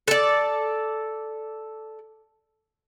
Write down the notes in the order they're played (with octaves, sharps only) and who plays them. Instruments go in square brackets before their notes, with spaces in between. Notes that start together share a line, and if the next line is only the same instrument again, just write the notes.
[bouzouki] A4 D5